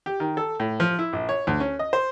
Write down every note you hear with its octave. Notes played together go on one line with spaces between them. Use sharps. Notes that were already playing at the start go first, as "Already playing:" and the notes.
G4
D#3
A4
A2
F3
E4
A#1
C#5
D2
C#4
D#5
C5